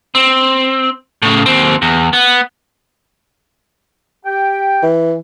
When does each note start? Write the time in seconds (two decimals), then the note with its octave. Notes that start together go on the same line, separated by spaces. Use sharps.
0.15 C4
1.22 A2 C#3
1.46 D#2 C4
1.82 E2
2.13 B3
4.25 G4 G5
4.83 E3